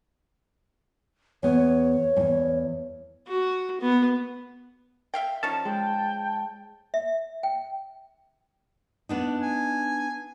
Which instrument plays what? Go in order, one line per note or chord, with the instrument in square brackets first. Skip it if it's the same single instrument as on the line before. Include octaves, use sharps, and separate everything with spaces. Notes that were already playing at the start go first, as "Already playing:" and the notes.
[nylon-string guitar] E2 B3 [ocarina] C#5
[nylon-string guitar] E2 G2
[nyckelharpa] F#4
B3
[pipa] E5 F5 G5
[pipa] F3 C#4 D#4 [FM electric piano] A5
[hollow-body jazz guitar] G#3 [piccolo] G5
[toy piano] E5
G5
[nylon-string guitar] B3 D4 D#4
[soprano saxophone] G#5